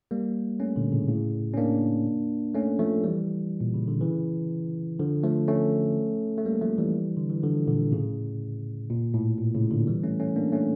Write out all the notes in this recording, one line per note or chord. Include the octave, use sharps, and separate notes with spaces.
G3 A#3
A3 C#4
A#2 D3
A2 C#3
A2 C#3
C#4
A#3 D4
A3 C#4
F3 A3
E3 G3
A#2
C#3
D3
C#3 E3
D3 F3
F3 A3
A3 C#4
A3
G3 A#3
F3 A3
E3 G3
D3
E3
D3 F3
A#2 D3
A2 C#3
A#2
A2
A#2
A2 C#3
A#2 D3
E3 G3
A3 C#4
A3 C#4
A#3 D4
A3 C#4